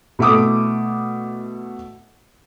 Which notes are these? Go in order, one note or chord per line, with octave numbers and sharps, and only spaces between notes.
B2 A3 E4 D6 D#6